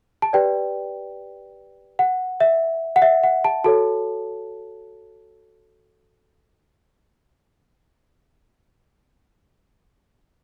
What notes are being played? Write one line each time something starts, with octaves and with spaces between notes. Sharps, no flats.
A5
G4 B4 D5 G5
F#5
E5
F#5
E5
F#5
A5
F#4 A4 C#5 A5